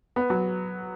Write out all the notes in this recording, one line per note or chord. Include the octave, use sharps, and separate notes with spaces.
B3
F#3